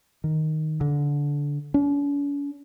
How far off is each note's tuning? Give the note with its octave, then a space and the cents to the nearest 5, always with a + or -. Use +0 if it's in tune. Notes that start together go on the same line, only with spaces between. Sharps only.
D#3 +0
D3 -20
C#4 +45